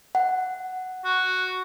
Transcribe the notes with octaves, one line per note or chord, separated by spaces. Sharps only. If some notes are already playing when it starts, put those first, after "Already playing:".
F#5
F#4